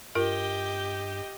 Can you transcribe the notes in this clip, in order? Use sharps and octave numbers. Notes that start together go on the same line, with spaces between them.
G2 F4 G4 A#4 D#5